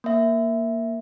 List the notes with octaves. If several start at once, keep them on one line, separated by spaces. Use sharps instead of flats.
A#3 E5